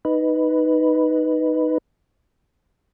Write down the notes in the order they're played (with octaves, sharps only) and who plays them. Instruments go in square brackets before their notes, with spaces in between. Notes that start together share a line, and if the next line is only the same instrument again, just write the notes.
[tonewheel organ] D#4 B4